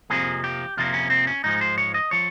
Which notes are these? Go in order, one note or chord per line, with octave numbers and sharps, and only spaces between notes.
F2 C3 F3 A#3 G#4
G4
F2 C3 F3 A#3 F4
C#4
C4
C#4
G#2 F3 G#3 D#4
C5
C#5
D#5
F3 C#5